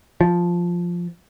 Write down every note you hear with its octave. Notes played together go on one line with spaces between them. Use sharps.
F3